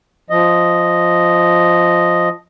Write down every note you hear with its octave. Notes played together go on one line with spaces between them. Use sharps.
F3 D#5